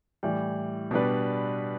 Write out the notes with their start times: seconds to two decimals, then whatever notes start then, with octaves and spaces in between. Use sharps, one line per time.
0.23 A2 E3 G3
0.91 B2 G3 D4 B4